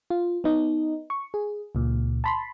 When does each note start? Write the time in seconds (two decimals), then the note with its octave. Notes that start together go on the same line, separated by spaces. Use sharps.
0.10 F4
0.44 B3 D#4
1.10 C#6
1.34 G#4
1.75 C#2 A#2
2.24 A5 B5 C6